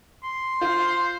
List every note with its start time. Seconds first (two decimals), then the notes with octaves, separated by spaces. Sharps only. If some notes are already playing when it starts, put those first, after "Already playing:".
0.24 C6
0.61 F4 C5